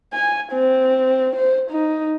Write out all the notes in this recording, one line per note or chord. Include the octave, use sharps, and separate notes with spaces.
G#5
C4
C5
D#4